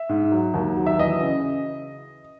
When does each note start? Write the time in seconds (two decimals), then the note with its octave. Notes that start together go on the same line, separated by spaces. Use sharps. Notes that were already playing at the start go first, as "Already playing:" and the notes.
Already playing: E5
0.09 G#2
0.32 F#3
0.54 D#2
0.76 F#3
0.86 E5
0.99 E3 D#5
1.21 C#3